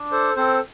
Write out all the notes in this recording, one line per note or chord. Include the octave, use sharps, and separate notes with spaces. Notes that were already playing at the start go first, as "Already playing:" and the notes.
Already playing: D4
A4 C5
C4 A4 C5